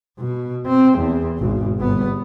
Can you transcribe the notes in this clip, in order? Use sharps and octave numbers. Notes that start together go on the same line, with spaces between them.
B2
C4
E2
G#1 B2
G1 B3